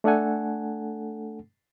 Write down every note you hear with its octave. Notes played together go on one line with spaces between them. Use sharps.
A3 D4 A4 F#5 G#5